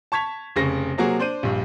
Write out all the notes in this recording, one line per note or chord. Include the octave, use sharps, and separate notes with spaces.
A5 C#6 G#6 B6 F7
F1 C#3 A#6
C3 F#3 A#3 F#4 G#4
D4 C5 G6 D#7
A#1 G2